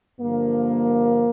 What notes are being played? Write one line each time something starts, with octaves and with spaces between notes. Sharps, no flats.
G2 D3 F3 A#3